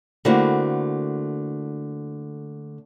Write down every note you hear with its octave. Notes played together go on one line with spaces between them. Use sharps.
D3 A3 A#3 C4 E4 F#4